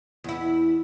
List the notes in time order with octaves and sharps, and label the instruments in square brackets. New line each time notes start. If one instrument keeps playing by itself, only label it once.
[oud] E2 E4